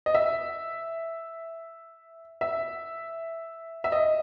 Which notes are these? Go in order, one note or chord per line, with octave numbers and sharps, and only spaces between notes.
D#5
E5
E5
E5
D#5